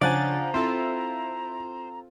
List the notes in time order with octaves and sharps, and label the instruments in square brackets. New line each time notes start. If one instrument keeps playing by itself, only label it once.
[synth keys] C#3 D4 A6 [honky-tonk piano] F3 [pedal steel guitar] D5 F#5 G#5 [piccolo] A#5
[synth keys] C4 F4 A4 [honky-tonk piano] E4 [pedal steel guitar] C5